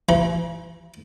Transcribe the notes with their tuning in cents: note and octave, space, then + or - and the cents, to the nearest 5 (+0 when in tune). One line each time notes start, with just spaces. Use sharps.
E3 +45 B5 -45